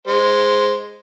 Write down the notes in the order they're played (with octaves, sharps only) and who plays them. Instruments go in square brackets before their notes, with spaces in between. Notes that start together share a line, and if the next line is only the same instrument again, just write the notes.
[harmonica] G#3 C5